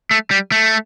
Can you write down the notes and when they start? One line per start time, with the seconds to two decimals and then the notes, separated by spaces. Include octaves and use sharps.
0.11 A3
0.31 G3
0.52 A3